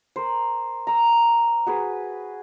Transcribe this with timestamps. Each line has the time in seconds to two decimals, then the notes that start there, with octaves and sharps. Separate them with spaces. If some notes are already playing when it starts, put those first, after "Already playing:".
0.16 A#4 C5
0.87 A#5 E6
1.66 F#4 G#4 B4